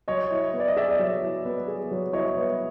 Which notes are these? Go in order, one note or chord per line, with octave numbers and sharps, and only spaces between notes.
F#3 C#5 D#5
E4
B3
D5
D#5
G#4 D5 E5
F#3
E4
B3
G#4
F#3
E4 C#5 D#5
B3